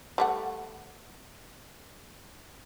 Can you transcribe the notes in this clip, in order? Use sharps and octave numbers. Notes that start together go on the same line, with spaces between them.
G3 A3 F#5